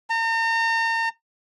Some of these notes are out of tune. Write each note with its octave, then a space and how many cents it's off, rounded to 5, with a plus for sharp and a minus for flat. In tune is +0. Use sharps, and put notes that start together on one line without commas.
A#5 -40